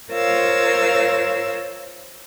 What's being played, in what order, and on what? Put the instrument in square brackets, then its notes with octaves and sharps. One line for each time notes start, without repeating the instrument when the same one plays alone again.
[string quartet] F4 A#4 C5 C#5 F5 E6